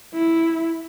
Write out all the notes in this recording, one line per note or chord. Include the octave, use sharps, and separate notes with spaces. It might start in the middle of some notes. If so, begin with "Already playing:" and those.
E4